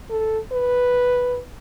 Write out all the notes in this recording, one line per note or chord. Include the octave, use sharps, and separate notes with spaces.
A4
B4